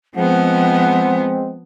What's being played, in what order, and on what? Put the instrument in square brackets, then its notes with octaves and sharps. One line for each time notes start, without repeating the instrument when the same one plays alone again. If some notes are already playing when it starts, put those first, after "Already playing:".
[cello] F3 B3 [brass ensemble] G#3 C4 [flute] F#5